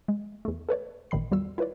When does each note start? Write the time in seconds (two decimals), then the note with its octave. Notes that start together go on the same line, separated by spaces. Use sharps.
0.08 G#3
0.45 E2 A3
0.69 A4 B4 C#5 D5
1.11 A1 A#2 D#3 B5 C7
1.31 E2 G3 F4 F#4 E6
1.58 E4 F4 B4 C#5 D5